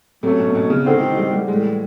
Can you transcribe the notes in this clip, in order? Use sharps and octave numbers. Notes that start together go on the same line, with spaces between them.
C3 F#3 A3 C#4
B2
B2
C#3
D3 D#3 G#3 C4 D#4 G4
E3
G3
G3
A2 E3 G3 G#3